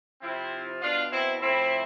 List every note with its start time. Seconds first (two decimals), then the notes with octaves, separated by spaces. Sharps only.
0.21 C3 F3 C4 E4
0.81 B2 D4 F4
1.11 C4 E4
1.40 A2 F3 C4 E4